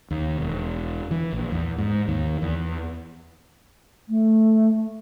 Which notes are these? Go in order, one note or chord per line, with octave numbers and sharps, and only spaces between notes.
D#2
E1
E3
A#1
E2
G#2
D#2
E2
A3